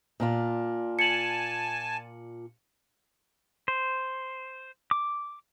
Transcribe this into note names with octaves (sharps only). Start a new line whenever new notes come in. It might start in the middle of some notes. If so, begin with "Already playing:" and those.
A#2 D4 F4
G#5 A5 C#7 F#7
C5
D6